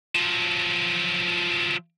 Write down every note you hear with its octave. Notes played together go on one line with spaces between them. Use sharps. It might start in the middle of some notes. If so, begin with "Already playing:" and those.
F3 F#3